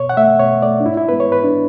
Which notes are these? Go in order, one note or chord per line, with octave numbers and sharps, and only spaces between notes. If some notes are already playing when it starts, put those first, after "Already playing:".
Already playing: B2 C#5
F#5
A3 E5
B2 C#5
A3 D5
D4
G#2 E4
E4
G#3 B3 B4
C#5
G#2 B4
D4